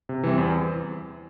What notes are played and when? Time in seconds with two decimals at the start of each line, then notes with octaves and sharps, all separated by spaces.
0.09 C3
0.23 E3 G3 C4
0.38 E2